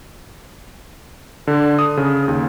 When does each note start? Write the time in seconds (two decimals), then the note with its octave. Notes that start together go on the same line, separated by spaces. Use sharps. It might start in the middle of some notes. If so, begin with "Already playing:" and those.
1.47 D3
1.79 D#6
1.97 C#3
2.28 D#2